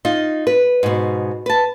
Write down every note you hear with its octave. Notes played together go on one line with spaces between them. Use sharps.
D#4 F4 D#5
B4
G#2 B2
B4 A5